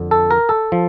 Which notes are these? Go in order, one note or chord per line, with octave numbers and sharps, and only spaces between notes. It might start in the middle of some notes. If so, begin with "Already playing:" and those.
Already playing: F2 D3
A4
A#4
A4
F3